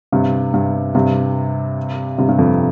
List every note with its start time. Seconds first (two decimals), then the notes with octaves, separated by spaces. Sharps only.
0.12 G2 C3
0.54 G2
0.95 G2 C3
2.18 G2 C3
2.28 G2
2.38 F2